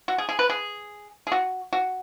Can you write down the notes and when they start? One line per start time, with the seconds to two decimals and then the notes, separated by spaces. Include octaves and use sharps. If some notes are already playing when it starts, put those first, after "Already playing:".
0.08 F#4
0.18 G#4
0.29 G#4
0.39 B4
0.50 G#4
1.27 G#4
1.32 F#4
1.73 F#4